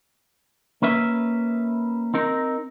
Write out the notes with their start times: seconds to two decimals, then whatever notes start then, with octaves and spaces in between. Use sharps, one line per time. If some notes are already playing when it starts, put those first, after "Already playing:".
0.82 A#3 C#4 B4 E5
2.14 C4 D#4 A#4